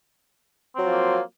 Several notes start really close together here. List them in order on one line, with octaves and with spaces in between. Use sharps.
C4 F#3 F4 F3 A#3